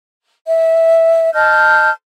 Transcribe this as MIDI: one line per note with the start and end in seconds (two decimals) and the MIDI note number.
0.45 1.29 76
1.34 1.90 75
1.34 1.90 81
1.34 1.90 89
1.34 1.90 91